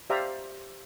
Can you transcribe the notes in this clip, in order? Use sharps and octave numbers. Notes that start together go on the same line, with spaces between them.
G4 C5 D5 E5 F5 A#5